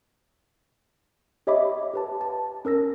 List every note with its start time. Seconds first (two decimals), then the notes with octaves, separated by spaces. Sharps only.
1.47 G4 C#5 D#5 E5 B5 D6
1.93 G4 B4 A5
2.21 A5
2.65 C#4 A#4 E6 A#6